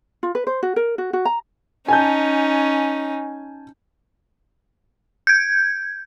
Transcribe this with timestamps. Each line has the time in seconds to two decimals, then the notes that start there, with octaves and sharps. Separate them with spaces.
0.23 F4
0.35 B4
0.47 C5
0.63 F#4
0.76 A#4
0.98 F#4
1.13 F#4
1.25 A#5
1.88 C#4 D#4 G#5 A5 G6
5.27 G6 G#6